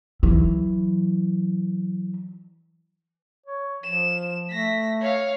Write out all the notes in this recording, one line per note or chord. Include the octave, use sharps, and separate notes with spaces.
E3 F#3
C#5
F3 E7
A3 A#6 B6
C#5 F5